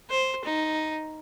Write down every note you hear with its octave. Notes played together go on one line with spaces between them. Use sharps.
C5
D#4